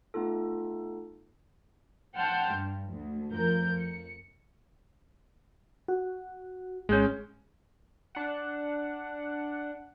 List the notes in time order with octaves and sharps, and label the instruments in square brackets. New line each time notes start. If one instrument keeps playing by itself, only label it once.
[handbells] A3 B3 D#4 F4 A4
[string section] F#5 G5 A5 C6 F6 G6
G2
D2
F2 F3 A#4 G6
C#7
[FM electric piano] F#4
[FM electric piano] G#1 G6 [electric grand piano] G#3 C#4
[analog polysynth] D4 F#5